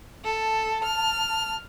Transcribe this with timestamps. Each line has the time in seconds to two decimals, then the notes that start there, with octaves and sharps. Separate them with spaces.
0.24 A4 A5
0.84 F6